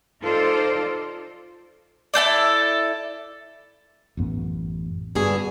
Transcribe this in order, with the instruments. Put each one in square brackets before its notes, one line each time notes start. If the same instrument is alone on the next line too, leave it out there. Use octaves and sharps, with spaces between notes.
[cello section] D#4 F4 A4 C5 D5
[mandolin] E4 A4 C5 D5
[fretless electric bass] A1 F#2 B3
[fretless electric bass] G2 [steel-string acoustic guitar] B2 D3 G#4